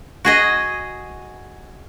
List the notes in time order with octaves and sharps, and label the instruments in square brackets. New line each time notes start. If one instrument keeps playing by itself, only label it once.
[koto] F#4 G#4 D#5